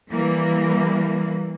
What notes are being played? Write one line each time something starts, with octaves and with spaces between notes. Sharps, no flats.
E3 G3 A#3